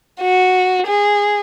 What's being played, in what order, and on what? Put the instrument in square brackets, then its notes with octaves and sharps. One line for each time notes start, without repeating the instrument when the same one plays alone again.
[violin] F#4
G#4